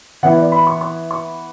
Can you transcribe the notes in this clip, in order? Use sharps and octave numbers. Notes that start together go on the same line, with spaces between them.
E3 B3 E4 F#5
D5
B5
C#6
C#6
C#6